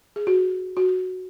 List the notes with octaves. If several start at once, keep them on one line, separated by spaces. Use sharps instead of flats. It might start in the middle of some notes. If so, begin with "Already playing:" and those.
G#4
F#4
F#4